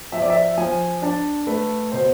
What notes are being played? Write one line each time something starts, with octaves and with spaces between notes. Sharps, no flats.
F3 E5
D5
E5
F3 G#5
D4 A5
A3 B4
B2 C5